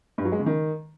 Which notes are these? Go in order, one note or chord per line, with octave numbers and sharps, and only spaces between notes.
G2
F#3
G#3
C#3
D#3